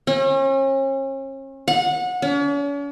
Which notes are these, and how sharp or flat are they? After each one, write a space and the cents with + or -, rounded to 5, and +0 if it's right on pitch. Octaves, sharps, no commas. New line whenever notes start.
C#4 -40
F#5 -25
C#4 +45